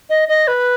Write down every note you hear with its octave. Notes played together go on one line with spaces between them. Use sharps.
D#5
D#5
B4